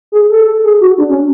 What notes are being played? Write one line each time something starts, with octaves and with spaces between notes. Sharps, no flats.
G#4
A4
G#4
F#4
D4
C#4